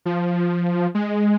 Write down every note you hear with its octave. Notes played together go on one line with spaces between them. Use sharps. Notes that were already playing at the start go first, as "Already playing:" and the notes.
F3
G#3